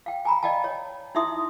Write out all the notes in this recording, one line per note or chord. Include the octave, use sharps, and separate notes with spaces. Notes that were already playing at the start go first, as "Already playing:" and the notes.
F5 G5
G#5 A#5 B5
D5 D#5 F5 G5 A5
C#5
D#4 E4 E5 C6 D#6